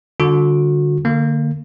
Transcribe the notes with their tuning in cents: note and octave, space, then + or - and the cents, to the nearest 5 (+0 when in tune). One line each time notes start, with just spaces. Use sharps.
D3 +0 G3 -5 F#4 -35
D3 +15 A#3 -15